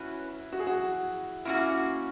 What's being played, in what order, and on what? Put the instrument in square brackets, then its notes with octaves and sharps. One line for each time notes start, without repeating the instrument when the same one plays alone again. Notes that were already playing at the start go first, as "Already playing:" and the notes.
Already playing: [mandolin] C#4 F#4 B4 [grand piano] E4
[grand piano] F#4
G#4
F#4
[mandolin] A#3 C#4 F#4 [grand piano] E4